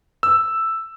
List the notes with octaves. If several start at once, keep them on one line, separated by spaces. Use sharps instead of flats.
E6